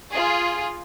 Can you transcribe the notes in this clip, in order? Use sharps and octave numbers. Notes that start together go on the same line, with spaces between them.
F4 G#4